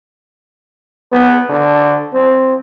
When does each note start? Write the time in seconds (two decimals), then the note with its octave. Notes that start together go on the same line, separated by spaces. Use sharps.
1.12 B3
1.49 D3
2.14 C4